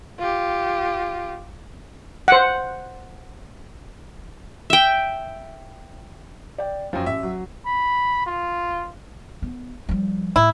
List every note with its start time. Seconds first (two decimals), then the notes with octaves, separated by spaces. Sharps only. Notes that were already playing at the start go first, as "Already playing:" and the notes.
0.19 F4 G4
2.28 C5 F#5
4.70 E5 G5
6.58 D5 G5
6.93 F#2 F3 F4 G5
7.06 A1 E5
7.23 F#3
7.66 B5
8.26 F4
9.42 B3
9.89 F3 G3
10.36 A2 E4